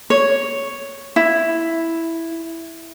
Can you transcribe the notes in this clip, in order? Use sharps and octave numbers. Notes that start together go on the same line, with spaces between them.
C#5
E4